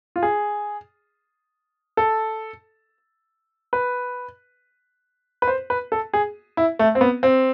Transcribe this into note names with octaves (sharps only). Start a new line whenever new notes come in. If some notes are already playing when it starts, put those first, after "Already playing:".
F4
G#4
A4
B4
B4
C5
B4
A4
G#4
E4
A3
C4
B3
C4